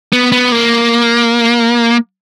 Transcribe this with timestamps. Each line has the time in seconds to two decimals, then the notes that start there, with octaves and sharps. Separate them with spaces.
0.13 B3
0.32 B3
0.52 A#3